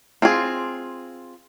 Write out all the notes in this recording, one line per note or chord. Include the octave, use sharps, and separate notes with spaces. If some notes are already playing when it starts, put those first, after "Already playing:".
C4 F4 G#4